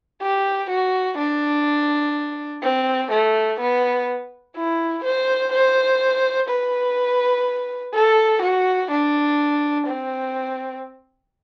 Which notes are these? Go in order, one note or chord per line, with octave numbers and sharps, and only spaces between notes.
G4
F#4
D4
C4
A3
B3
E4
C5
C5
B4
A4
F#4
D4
C4